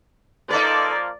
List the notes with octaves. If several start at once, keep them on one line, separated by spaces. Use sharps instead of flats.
F3 A#3 D#4 A4 B4 D5